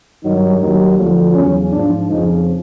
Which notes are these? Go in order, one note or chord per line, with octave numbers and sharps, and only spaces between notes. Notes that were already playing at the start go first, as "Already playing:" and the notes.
G2 D#3 F#3 D#4
D#2 D#3 F#3
D2 D3 F3
E2 C#3 F#3 C#4
G#2 F3 D4
F2 C#3 F3 D#4